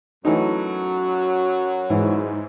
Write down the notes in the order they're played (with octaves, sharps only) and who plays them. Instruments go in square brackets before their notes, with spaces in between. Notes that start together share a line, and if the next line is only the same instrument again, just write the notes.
[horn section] F#2 F#3 [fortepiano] E3 A3 D#4
[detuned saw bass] G#2 [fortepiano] E3